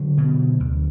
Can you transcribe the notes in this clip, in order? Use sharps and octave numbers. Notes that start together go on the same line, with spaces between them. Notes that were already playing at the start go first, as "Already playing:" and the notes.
Already playing: D3 F#3
B2
D2